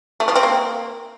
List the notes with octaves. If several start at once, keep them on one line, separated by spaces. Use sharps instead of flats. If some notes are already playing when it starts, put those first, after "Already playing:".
A3
F3
C4
A#3